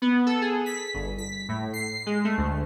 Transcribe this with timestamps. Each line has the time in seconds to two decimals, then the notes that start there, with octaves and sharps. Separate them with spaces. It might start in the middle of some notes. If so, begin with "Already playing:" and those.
0.02 B3
0.26 A4
0.41 G#4
0.66 B6
0.94 G1
1.18 B6
1.49 A2
1.73 C7
2.06 G#3
2.25 A3
2.37 D2